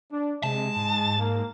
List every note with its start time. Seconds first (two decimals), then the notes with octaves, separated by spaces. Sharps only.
0.12 D4
0.43 C3 G#3 A5
0.76 G#2
1.18 A#3